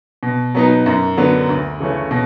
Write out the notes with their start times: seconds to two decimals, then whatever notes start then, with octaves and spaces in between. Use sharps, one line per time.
0.23 B2
0.55 F#3 B3 D#4
0.86 F#2
1.17 D3 F#3 B3
1.49 D2
1.80 C#3 E3 A3 C#4
2.11 B2